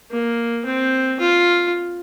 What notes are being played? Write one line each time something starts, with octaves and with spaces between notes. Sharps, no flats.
A#3
C4
F4